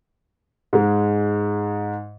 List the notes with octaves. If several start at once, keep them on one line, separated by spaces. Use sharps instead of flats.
G#2 G#3